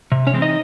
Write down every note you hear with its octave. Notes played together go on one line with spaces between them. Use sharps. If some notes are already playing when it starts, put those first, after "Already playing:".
C3
C#4 C#5
E3 G#3 C4
D#4 D#5